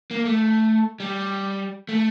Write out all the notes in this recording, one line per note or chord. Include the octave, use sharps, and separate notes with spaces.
A#3
A3
G3
A3